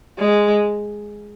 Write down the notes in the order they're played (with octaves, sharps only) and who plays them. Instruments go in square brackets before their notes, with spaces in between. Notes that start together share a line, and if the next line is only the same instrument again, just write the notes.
[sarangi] G#3